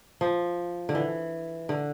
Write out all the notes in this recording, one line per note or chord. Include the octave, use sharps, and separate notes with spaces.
F3
D3
E3
D3